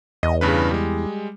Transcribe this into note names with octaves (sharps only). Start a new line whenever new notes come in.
E2 D#5
G2 C#3 B4
G3 G#3